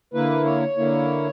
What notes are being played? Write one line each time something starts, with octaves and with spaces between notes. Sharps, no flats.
D3 A#3 E4 B4
C#5
D3 A#3 E4